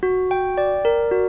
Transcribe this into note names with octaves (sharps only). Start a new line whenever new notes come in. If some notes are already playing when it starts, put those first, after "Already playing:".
F#4
G5
D5
A#4
F#4